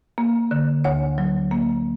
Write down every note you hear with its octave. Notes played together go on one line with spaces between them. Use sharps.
A#3
D3
D2 C#5
F#3
A#3